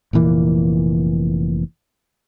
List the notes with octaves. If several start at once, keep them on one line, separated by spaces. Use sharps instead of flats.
F1 A#2 E3 A#3